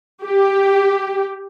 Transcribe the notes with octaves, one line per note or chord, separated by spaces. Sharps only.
G4